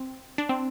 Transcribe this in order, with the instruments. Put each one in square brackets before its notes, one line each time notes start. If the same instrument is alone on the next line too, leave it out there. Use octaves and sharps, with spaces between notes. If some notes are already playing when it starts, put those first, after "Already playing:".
Already playing: [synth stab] C4
D4
C4